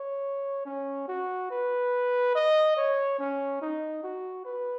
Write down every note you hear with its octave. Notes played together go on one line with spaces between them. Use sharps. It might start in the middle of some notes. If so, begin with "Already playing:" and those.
Already playing: C#5
C#4
F#4
B4
D#5
C#5
C#4
D#4
F#4
B4